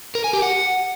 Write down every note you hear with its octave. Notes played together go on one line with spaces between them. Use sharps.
A#4
G#5
G4
F#5